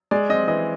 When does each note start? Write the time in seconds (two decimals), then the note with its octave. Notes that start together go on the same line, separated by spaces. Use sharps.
0.11 G#3 D5
0.29 C4 D#5
0.47 E3 D#5